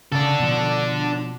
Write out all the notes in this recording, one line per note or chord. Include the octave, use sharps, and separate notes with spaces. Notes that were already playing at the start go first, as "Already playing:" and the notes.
C#3 D4 A4
B2 F3